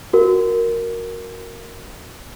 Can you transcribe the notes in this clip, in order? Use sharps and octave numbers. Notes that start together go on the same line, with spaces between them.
F#4 A#4